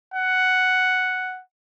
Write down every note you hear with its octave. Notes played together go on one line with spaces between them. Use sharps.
F#5